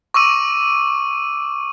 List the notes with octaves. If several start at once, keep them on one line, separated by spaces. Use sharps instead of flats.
C#6 D6 E6 D#7